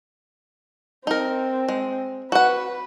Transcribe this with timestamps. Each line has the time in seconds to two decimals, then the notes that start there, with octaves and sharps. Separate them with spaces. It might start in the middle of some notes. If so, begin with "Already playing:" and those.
1.07 C4 D#4 A#4
1.68 G#3
2.32 F#4 B4 F#5